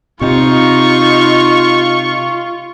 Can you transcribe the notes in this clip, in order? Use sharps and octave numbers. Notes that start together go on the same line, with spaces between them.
C3 D#4 F4 C#6